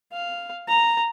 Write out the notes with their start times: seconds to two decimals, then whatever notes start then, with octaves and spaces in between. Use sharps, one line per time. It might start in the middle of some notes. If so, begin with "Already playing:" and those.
0.13 F5
0.68 A#5